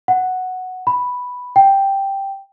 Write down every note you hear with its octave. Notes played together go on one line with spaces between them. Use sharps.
F#5
B5
G5